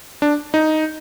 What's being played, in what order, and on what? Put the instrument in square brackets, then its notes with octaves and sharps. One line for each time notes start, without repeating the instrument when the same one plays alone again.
[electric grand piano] D4
D#4